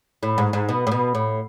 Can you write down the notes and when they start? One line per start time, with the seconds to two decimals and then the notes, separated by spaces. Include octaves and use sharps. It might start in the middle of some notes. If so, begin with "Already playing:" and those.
0.23 A2
0.38 G#2
0.53 G#2
0.69 B2
0.87 A2
0.92 B2
1.15 A2